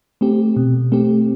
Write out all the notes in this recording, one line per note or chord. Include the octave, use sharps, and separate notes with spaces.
A3 C4 G4
B2
A3 C4 G4